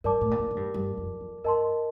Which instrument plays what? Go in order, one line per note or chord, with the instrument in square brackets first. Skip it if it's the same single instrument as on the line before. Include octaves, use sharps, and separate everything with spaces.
[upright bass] G2 [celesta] A#4 D5 A5 D6
[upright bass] A2
A#2
A2
A2
G2
G2
F2
F2
[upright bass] G2 [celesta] A#4 D#5 A5 C6